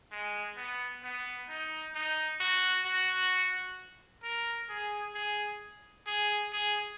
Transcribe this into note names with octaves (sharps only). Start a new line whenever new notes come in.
G#3
B3
B3
D#4
D#4
F#4
F#4
A#4
G#4
G#4
G#4
G#4